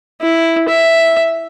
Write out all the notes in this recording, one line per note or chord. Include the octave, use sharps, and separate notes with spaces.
E4
E5